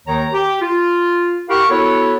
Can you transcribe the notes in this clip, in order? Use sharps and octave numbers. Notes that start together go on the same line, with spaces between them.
D#2 D#3 C#5 A#5
G4
F4
E4 G4 A#4 F5 F#5 C#6
B3 E4 F#4 A4 C#5